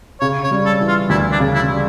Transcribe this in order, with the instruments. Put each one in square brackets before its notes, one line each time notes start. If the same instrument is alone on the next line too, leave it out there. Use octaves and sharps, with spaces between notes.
[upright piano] C#3 [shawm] C#5
[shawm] C#5
[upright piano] G3
[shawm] A4
[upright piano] E3
[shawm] F4
[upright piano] D2 [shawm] E4
[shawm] D4
[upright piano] C#3
[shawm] E4
[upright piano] G3